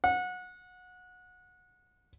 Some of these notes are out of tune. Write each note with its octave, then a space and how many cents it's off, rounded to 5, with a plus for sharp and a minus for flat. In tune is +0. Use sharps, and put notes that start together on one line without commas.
F#5 -25